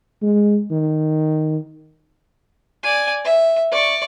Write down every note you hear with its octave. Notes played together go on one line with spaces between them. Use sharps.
G#3
D#3
D5 G#5
E5
D5 C#6